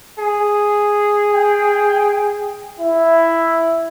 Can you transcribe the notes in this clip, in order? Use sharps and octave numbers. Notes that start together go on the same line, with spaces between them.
G#4
G5
E4